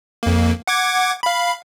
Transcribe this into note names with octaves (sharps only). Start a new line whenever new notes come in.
F2 A#3
F#5 D6 G#6
F5 B5